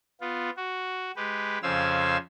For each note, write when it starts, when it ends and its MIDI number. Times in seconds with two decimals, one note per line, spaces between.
0.21 0.50 59
0.21 0.50 65
0.57 1.11 66
1.16 1.58 56
1.16 1.58 67
1.16 1.58 71
1.63 2.17 41
1.63 2.17 49
1.63 2.17 72
1.63 2.17 77
1.63 2.17 80
1.63 2.17 88